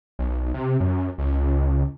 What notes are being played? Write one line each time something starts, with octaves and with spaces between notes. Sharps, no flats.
B1
C3
F#2
C#2